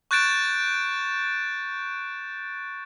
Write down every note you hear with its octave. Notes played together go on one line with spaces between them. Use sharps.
C#6 F#6 G6 A6 D7 E7